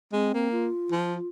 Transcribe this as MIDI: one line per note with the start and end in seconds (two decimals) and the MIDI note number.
0.12 0.33 56
0.12 0.49 60
0.34 0.69 58
0.52 1.28 65
0.92 1.16 53